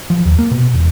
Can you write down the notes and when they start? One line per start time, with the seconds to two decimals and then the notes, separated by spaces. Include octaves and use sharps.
0.10 F3
0.25 D#2
0.39 A#3
0.51 B2
0.74 E1